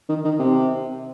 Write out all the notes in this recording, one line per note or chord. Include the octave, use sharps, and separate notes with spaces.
D#3
D#3
C3